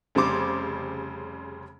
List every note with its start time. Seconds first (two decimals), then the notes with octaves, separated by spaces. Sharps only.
0.15 F1 C#3 G3 C5 D6